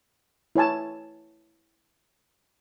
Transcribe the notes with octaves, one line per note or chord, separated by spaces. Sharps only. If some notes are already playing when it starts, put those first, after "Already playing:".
E4 C#5 G#5 A5